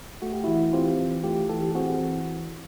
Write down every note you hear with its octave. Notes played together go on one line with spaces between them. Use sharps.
A3 F#4
G4
E3 E4 F#4
C4 F4 G4
E3
A3 F4 G4
E3 G4 A4
G4
C4 F#4 G#4
E3